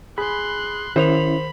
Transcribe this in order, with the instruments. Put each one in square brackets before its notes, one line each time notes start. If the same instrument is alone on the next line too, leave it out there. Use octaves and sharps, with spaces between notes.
[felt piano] G#4 [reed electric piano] B5 [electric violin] C6 F#6
[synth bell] D#3 A#4 F7 [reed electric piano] C#4 E4 [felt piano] C5 [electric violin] B5